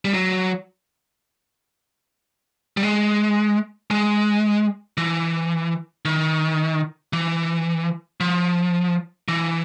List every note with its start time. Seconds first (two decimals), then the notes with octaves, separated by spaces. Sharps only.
0.05 G3
0.14 F#3
2.77 G3
2.83 G#3
3.91 G#3
4.98 E3
6.05 D#3
7.13 E3
8.20 F3
9.28 E3